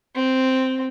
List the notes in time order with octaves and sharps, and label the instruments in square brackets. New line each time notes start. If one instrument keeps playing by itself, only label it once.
[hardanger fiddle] C4